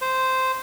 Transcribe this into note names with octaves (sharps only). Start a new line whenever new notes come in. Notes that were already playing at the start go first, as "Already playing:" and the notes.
C5